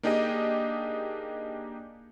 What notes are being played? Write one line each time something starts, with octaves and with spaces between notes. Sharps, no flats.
A#3 D4 D#4 G4 G#4 D#5